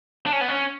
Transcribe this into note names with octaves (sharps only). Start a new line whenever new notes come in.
D4
C#4
B3
C#4